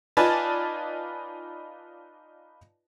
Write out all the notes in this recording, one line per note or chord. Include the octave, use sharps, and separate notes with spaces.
D#4 F4 B4 D5 G#5 A5